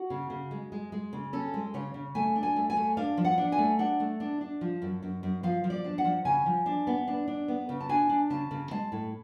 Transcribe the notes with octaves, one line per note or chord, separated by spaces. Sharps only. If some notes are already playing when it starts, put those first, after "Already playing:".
Already playing: F#4
C#3
C#3
G#3
G#3
G#3
C#3
C#4 A4
G#3
C#3 C#5
C#3
A3 G#5
D4
G#5
A3
G#5
A3
D4 F5
F3
F#5
D4
G#5
A3
D4 F#5
A3
D4
D4
F3
F#2
F#2
F#2
F3 F5
F3
D5
D4
F#5
F3
C#3 G#5
F3
D4
B3
D4
D4
B3
C#3
A5
D4 G#5
D4
C#3 A5
C#3
G#3 A5
A2